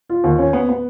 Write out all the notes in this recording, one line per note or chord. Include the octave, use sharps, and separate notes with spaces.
F4
D#2
C#4
B3
B3